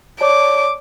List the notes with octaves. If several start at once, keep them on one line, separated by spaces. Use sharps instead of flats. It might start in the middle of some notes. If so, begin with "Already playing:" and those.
C#5 D5 A5 D6